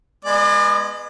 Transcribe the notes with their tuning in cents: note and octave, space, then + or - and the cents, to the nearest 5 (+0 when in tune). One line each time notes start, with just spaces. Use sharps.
G#3 +0 B3 +0 D5 +45